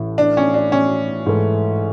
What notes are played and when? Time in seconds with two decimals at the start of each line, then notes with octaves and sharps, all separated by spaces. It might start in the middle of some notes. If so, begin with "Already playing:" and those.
Already playing: A1 A2 E3
0.18 D4
0.37 C#4
0.54 D4
0.72 C#4
1.26 G#2 E3 A3